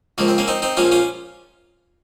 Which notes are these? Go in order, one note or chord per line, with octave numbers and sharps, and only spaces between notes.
C#2 C#3 F3 A#3
C4
A#3 C#4
C4 D#4
C4 D#4
A#1 A#2 F3 C#4 F4
C#4 F4